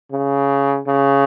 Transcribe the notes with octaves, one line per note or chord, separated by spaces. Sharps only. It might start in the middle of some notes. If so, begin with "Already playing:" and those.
C#3
C#3